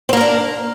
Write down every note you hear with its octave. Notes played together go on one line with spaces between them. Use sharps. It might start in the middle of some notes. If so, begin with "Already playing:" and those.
A#3 C4 D4 A#4